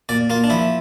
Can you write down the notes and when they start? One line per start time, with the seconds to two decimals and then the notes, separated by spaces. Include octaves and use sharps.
0.09 A#2 D5
0.30 A#3 F4
0.44 D4
0.50 F3 E4